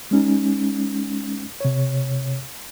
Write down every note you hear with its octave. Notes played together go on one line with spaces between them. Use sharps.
G#3 C#4 D#4
C3 C#5